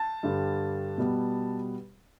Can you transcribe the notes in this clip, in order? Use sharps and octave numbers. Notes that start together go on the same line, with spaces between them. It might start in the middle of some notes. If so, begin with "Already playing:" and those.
Already playing: A5 A6
G2 D3 G3
B2 G3 B3